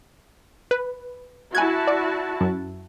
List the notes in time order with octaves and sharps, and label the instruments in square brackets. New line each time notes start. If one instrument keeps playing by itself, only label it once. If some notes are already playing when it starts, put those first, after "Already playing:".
[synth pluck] B4
[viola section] E4 F#4 A5 [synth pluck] G#5 F#6 G#6
[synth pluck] D5
F#2